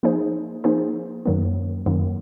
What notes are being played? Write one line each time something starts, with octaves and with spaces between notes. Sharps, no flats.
F3 A#3 D#4 G#4 C5
F3 A#3 D#4 G#4 C5
F#2 D#3 F#3 A#3
F#2 D#3 F#3 A#3